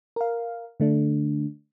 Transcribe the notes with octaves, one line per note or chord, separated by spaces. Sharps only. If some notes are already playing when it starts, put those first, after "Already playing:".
A#4 F5
D3 A3 D4